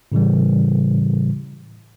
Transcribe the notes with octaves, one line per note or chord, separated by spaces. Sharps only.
A2 C#3 E3 G3